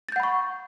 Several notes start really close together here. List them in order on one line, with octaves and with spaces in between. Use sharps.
A6 G6 F#5 B5 C#6